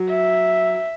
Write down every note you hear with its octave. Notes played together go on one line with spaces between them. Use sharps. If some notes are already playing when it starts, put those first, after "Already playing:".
Already playing: F#3
E5